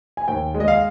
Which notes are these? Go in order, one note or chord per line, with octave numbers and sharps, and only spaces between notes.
G#5
D#2 G5
G#3
D#5
F5